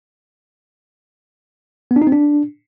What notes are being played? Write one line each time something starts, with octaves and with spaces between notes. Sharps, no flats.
B3
D4
D#4
C4
D4